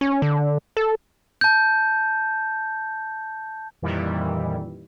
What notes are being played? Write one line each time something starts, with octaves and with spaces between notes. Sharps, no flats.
C#4
D3
A4
A5 G6
F2 A#2 D#3 E3 G3 E4